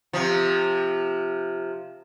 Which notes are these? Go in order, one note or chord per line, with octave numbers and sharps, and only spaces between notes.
C3 F3